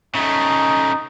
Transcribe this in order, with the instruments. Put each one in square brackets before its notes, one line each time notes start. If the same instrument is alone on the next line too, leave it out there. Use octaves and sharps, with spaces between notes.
[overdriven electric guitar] C#3 A3 [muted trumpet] D#4